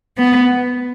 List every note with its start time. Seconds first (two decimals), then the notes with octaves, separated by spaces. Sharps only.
0.17 B3